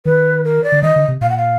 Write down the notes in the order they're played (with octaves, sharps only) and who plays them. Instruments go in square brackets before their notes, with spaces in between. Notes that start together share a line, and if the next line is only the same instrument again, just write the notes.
[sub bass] D#3 [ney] B4
[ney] A#4
D5
[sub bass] D3
[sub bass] D#3 [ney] D#5
[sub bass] D3
C3
[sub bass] A#2 [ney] F5
[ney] F#5
F5